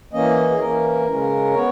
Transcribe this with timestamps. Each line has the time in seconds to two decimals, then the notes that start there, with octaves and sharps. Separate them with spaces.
0.13 E3 A#3 C#4 D#5
0.50 G#4
0.60 E3 A#3 C#4 A#4
1.07 C#3 G#3 C#4
1.54 B3 C#5